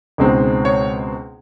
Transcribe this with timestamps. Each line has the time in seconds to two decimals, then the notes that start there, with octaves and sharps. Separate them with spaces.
0.18 C#2 B2 G#3 C4 D#4
0.65 C#5